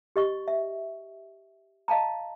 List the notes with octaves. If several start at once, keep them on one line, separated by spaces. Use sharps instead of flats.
G4 D#5 C#6
E5
D#5 F5 A5 A#5